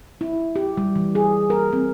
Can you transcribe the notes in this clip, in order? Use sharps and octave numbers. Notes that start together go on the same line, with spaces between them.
E4
G4
G3
E3
G#4
A#4
C4